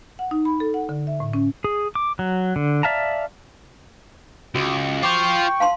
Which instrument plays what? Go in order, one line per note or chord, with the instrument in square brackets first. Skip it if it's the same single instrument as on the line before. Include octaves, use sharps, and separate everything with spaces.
[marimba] F#5
D#4
B5
A4
F#5
D3
E5
A2
C#4
[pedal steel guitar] G#4
D6
F#3
D3
D5 E5 F5 A5 A#5
[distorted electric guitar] C#2 [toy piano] F#4
[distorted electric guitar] F4 C5 [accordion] G5 C#6 [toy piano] D6
[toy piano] F5 A5 C6